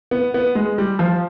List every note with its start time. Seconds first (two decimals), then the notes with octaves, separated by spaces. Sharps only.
0.11 B3
0.34 B3
0.55 G#3
0.78 G3
0.99 F3